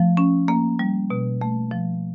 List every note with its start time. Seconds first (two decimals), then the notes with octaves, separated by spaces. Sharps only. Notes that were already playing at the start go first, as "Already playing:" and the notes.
Already playing: F3 A3
0.17 C#4
0.48 A#3
0.79 G3
1.10 B2
1.41 A3
1.71 F3